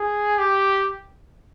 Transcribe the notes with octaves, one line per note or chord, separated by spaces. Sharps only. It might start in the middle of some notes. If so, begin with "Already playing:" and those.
Already playing: G#4
G4